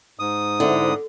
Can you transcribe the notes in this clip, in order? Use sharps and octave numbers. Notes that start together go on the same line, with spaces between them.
G#2 D#6
D3 C4 E4